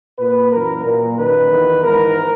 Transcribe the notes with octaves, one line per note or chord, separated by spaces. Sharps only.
A#2 B4
F#2 E3 A#4
A#2
F#2 D#3 B4
E2 D#3
G#2 E3 A#4